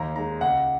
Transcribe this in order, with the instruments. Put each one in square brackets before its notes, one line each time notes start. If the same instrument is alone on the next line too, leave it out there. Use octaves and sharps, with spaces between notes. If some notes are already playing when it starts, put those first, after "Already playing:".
Already playing: [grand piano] D#2 A#5
D#3 G#3 A#5
C#2 F#5